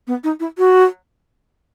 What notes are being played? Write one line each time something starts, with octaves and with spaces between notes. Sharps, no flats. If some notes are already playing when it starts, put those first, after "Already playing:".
B3
D#4
E4
F#4